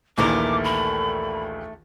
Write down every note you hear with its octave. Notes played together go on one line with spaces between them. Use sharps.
A#1 D#2 D#3 E3 A3 A#4 D6
B5